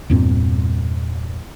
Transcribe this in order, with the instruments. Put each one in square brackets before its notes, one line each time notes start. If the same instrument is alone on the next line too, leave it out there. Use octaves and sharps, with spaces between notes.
[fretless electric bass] E2 G2 A#2 C4